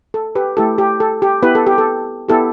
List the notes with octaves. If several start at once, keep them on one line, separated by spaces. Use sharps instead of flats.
A4
G4 B4
A3 E4 G4 A4
G4
A4
G4
B3 E4 G4 B4
A4
G4
A4
B3 E4 G4 A4